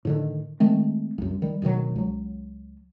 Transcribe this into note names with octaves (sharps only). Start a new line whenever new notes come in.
A2 D3 D#3
D#3 G#3 A3 C4
C2 F#2
D#3 G3
D1 B2 D#3 F#3
C#2 F#3